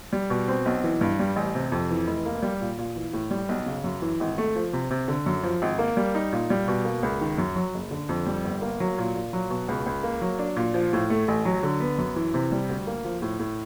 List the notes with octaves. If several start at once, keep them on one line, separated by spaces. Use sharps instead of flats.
G3
B2
C4
B1
E3
G2
G3
A1
C3
F2
E3
F1
A#3
G3
A#2
A#2
E3
A2
G3
B1
C#3
F#2
E3
G#1
A3
F3
C3
C3
D3
F#2
F3
G#1
A#3
G3
D#4
A#2
G3
B2
A#3
C#2
D#3
F#2
F#3
F#1
D3
F2
G3
G1
A#3
F#3
A#2
A#2
F#3
B2
C#2
C#2
A#3
F#3
D4
A#2
F3
A2
A3
A1
F#3
D3
B3
F#2
E3
C3
G3
D2
A#3
F3
A2
A2